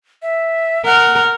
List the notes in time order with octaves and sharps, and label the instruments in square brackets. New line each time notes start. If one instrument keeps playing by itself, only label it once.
[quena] E5
[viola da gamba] A#4 [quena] F#5